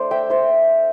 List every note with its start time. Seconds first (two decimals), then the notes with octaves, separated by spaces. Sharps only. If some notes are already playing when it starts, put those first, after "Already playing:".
Already playing: A3 D4 C5 D5
0.11 E5 G5
0.30 C5 E5